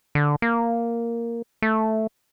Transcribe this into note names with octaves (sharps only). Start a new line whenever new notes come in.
D3
A#3
A3